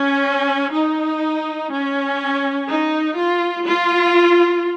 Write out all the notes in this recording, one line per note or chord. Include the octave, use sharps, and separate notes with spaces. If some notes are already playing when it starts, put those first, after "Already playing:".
Already playing: C#4
D#4
C#4
D#4
F4
F4